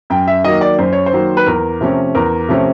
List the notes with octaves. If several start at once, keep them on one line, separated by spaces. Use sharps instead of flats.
F#2 G5
E5
D#3 F#3 A#3 D#5
D5
F#2 C5
C#5
C5
D#3 F#3 A#3
B4
E2 A#4
C3 F3 A3 C#4
E2 A#4
C3 F3 A3 C#4